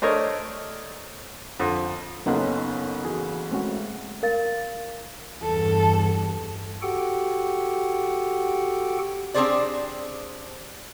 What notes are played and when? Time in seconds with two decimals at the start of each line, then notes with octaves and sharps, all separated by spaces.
0.02 A3 D4 A#4 C5 C#5 D#5
1.60 F2 D3
2.26 F#1 F#3 B3 C#4 D#4 A4 C6
3.04 E3 F#4 G#4
3.51 G#3 A3 C4 C#4 F#4
4.23 A#4 F5 A6
5.43 E2 G2 A4
6.82 F#4 G4 A4 F#5 G5
9.34 C4 D4 G4 G#4 C5 D5